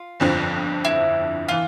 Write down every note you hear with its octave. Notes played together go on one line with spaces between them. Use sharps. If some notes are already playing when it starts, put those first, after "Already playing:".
Already playing: F4
G1 F2 D3 F3 C4
E4
E3 F4